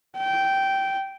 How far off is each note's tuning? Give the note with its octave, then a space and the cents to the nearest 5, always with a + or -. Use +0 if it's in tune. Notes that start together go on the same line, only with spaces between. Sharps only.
G5 -10